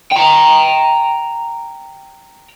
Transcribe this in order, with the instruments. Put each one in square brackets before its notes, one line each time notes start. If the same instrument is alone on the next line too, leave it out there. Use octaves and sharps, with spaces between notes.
[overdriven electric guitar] G5 A#5